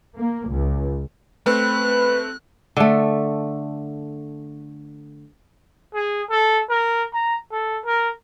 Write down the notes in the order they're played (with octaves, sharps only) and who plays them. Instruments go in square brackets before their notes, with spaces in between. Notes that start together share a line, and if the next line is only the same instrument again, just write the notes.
[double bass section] A#3
C#2
[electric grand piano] A3 C4 [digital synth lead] B4 [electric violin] F#6
[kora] D3 A3
[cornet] G#4
A4
A#4
A#5
A4
A#4